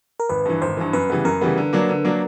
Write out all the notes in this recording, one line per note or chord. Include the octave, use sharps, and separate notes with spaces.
A#4
G#1 B4
G2 E3
G#1 C5
G2 E3
F#2 B4
C#3 E3 G3 B3
F#2 A#4
C#3 E3 G3 B3
D3
F#3 A#3 D4
D3
F#3 A#3 D4